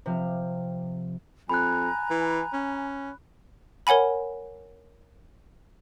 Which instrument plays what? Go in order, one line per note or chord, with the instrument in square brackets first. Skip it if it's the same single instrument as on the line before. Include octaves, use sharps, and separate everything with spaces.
[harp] C3 F3 F5
[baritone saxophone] F2 [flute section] G#5 A#5 [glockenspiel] B5 F#6
[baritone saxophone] E3
C#4
[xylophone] A#4 C#5 F#5 G#5 B5